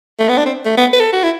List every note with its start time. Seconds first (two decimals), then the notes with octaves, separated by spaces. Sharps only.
0.19 A3
0.29 B3
0.38 D4
0.46 C4
0.65 A3
0.77 B3
0.93 B4
1.00 A4
1.13 F#4
1.23 E4